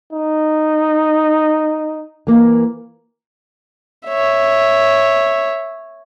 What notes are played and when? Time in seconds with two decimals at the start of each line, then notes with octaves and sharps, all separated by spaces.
0.13 D#4
2.27 E3 A#3
4.08 C#5 E5